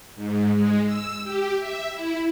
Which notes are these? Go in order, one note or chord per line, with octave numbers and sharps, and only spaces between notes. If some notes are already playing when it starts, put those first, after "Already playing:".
G#2
G#3
E6
G4
E5
E4